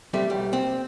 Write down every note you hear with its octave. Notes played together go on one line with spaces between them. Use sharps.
G3 A3 C4
B1 G3
C4